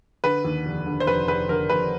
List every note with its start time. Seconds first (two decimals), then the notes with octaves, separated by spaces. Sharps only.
0.24 D3 B4
0.45 D#2
0.66 F1
0.86 D3
1.00 C5
1.07 F1 B4
1.28 F1 B4
1.49 D3 A#4
1.69 F1 B4